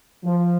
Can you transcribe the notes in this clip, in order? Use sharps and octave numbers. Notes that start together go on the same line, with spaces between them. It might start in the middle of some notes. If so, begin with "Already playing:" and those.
F3